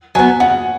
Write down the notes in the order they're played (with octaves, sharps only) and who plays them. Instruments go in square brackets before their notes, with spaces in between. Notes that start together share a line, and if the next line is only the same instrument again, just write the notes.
[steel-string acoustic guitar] F#3 [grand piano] G#5
[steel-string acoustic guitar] B3
[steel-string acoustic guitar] C#3 [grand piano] F#5